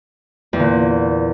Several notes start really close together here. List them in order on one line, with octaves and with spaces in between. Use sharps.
E2 D3 A#2